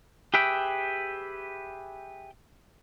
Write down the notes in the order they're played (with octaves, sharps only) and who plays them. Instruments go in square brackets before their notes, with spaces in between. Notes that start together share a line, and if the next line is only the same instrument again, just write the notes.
[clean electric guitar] G4 G#4 B4 E5 G5